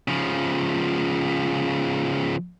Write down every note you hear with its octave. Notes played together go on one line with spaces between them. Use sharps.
C#3 F3